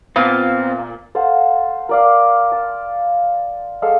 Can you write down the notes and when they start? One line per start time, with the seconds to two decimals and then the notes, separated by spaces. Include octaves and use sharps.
0.16 A#2 B3 C4 F4 F5 A5
1.15 A4 C5 F5 F#5
1.89 A#4 D5 F5
2.52 A5
3.82 G#3 A4 F5